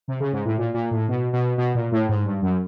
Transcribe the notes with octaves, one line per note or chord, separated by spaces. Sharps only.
C3
C#3
G#2
A2
A#2
A#2
A2
B2
B2
B2
A#2
A2
G#2
G2
F#2